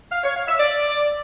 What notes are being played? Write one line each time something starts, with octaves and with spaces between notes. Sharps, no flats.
F5
C#5
F5
E5
D5